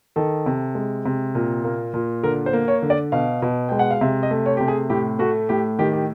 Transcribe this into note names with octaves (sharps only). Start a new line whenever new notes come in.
D#3 A4
C3
G#3
C3
A#2
A#3
A#2
D3 A#4
C5
A#3
C#5
D3
D5
B2 F5
B2
G#3 G5
F#5
F5
C3 E5
D#5
A3
C#5
C3 G4
G#4
A2 G4
A3 F#4
A2 G4
D#3 G4
G4